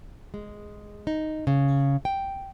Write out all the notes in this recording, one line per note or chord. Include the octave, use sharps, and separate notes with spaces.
G#3
D#4
C#3
G5